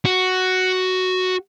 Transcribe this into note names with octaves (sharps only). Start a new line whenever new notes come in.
F#4